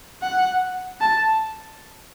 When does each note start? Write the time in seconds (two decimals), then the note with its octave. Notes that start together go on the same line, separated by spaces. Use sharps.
0.22 F#5
1.01 A5